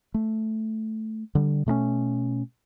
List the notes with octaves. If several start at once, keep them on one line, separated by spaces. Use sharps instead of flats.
A3
D3 G3
B2 A3 B3 C#4